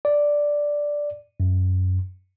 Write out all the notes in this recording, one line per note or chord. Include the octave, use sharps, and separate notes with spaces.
D5
F#2